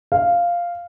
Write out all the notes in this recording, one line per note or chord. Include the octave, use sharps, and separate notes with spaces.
F5